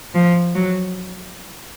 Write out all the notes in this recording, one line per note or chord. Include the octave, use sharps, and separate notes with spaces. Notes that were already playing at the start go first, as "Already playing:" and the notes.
F3
F#3